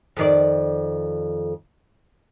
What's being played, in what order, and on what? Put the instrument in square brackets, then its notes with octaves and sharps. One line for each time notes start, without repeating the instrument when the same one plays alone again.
[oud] F2 D#3 D5